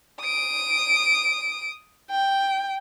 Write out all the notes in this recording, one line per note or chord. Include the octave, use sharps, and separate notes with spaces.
D#6 D7
G5